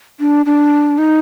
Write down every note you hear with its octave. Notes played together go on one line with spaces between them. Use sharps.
D4
D4
D#4